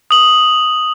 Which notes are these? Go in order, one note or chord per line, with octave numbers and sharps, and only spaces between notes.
D#6 F#7